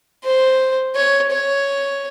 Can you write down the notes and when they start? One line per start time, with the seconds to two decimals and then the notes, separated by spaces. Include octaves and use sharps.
0.24 C5
0.96 C#5
1.32 C#5